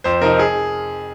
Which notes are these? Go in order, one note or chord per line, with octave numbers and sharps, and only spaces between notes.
F2 C5
C3 F3 C4 D#4 A#4
G#4